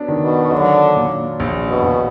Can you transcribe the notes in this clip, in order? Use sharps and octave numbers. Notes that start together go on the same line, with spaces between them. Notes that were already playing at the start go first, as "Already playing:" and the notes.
Already playing: F#3 B3 D4
D#3
B2
D3 F#3
A#2
A#1
B2
A#1